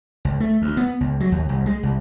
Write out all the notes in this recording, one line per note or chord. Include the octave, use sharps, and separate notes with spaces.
C#2
A3
D2
B3
C#2
F#3
D#2
C2
G#3
C2